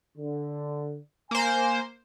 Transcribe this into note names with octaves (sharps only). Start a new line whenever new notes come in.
D3
A#3 C5 G#5